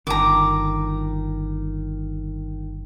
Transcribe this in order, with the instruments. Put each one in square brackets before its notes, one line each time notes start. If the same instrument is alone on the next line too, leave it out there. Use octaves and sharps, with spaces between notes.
[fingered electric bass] G1 [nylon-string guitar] D#3 [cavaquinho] A#5 D6